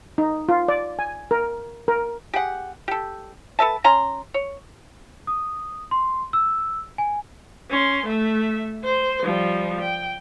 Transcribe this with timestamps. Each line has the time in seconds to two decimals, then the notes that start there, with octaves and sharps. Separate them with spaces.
0.18 D#4
0.49 F4
0.68 D5
0.99 G#5
1.31 A#4
1.88 A#4
2.33 G4 G#4 F#5
2.88 G4 A4
3.59 A4 B4 E5 A5
3.84 C#4 A#5 C6
4.34 C#5
5.27 D#6
5.91 C6
6.33 E6
6.98 G#5
7.70 C#4 C6
8.06 A3 E5
8.84 C5
9.23 F3 G3
9.81 G5